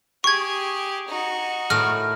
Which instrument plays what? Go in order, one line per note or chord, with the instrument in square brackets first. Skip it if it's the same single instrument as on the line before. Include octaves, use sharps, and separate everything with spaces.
[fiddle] G4 G#4 [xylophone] C#6 G#6
[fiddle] D#4 F#4
[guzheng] A2 A#4 [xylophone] F6